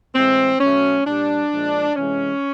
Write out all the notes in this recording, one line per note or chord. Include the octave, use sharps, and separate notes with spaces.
A2 E3 G#3 C4
B2 F#3 A3 C#4
A#2 G3 D4
A#2 F3 G#3
C3 E3 G#3 C#4